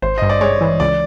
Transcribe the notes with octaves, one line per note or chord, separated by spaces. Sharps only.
G#1 C5
G2 D#5
D5
G#3 C#5
E3
C#2 D5